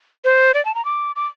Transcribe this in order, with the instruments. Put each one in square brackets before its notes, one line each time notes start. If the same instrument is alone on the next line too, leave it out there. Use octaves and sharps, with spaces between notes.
[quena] C5
D5
A5
A#5
D6
D6